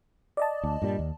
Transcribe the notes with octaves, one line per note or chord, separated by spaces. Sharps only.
D5 D#5 A5
D2
G2 A#2 G3
D#2